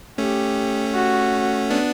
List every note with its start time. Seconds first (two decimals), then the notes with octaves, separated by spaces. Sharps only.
0.18 A3 C#4 G4
0.94 F#4
1.70 B3 D4